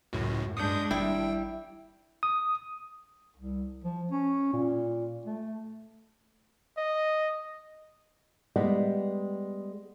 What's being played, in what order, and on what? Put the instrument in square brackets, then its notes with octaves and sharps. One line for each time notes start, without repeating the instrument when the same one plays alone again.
[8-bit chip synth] C#2 F#2 A2 [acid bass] F#4
[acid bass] G2 [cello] G#3 D4 [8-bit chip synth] D#6 G6
[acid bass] G#1 [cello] G3 [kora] E4 [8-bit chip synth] G5
[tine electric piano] D#6
[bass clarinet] C2
F3
C#4
A#2
A3
[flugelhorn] D#5
[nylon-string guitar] G3 G#3 B3